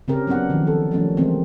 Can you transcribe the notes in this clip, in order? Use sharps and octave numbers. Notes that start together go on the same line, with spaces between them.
C#3 C4 C#4 G4 A#4
F#3 B3 C4 D4 F#5
D#3 F3
A4
F3 G3 A3 A#3 C#4 D4
E3 G3 G#3 A#3 C4